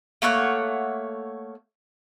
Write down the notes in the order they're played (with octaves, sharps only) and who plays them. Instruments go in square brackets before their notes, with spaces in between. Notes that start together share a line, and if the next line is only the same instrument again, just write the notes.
[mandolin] A3 A#3 C#5 F#5